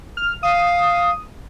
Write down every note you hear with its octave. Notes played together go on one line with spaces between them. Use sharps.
F6
F5 D#6